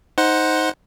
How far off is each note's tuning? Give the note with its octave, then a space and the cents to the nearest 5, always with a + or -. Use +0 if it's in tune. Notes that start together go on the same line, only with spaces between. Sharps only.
D#4 +15 C5 +0 F#5 +0